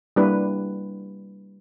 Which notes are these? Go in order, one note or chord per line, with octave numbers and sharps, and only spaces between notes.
G3 A#3 D4 E4 B4